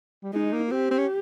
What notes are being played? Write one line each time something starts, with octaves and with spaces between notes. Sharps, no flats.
G3
G#3 D#4
A#3
C4 G4
C4
C#4